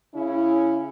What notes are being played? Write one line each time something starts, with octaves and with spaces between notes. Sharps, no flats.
C#3 C#4 E4